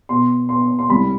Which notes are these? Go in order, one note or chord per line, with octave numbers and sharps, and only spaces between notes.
B2 B3 C6
B2 B3 C6
C6
C2 C3 G3 B5